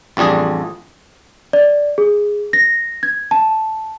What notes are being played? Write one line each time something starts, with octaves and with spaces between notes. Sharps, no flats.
A1 F2 G3 D4 G#4
D5
G#4
A#6
G#6
A5